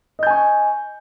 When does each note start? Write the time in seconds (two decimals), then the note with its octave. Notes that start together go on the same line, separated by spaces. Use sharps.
0.19 D#5
0.23 G6
0.27 G#5
0.31 C#6